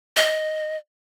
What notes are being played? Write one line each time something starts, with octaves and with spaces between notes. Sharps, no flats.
D#5